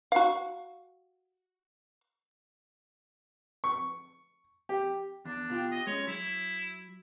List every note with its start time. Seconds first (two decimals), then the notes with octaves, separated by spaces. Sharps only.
0.12 F#4 F5
3.64 C#6
4.69 G4
5.25 E2 D4
5.50 B2 F4 G4
5.71 D#5
5.87 G#3 C#4 C#5
6.07 F#3 E4